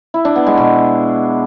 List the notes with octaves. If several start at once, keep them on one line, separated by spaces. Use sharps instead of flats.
E4
D4
B3
G#3
B2